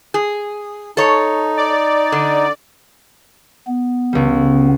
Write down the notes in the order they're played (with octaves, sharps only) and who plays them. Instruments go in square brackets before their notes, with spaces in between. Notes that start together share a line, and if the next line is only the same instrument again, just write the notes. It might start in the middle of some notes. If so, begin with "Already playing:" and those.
[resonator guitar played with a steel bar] G#4
[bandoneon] D#4 [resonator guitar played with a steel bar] A4 C#5
[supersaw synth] D5
[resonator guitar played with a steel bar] D3
[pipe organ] B3
[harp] C#2 G3